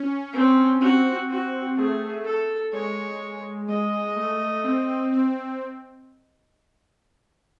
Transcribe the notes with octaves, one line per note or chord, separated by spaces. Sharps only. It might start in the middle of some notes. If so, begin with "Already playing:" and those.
Already playing: C#4
C4
C4 F#4
F#4
A3 G#4
A4
G#3 C#5
G#3 D#5
A3
C4
C4